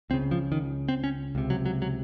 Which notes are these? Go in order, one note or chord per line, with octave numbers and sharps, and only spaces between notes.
C#2 C#3 C4
F3
D#3
C4
C#4
C#2 C3
F#3
F#3
F#3